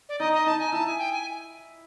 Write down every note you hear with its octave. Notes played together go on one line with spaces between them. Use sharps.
D5
D#4 D#5
D#5
D#4 A5
G#5
E4 A5
G#5
G5
G#5